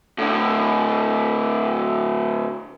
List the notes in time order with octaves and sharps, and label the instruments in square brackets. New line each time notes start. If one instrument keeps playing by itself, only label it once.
[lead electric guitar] A2 D3